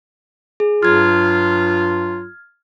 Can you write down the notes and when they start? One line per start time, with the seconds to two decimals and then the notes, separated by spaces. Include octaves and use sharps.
0.60 G#4
0.83 G2 F#3 F4 F6 G#6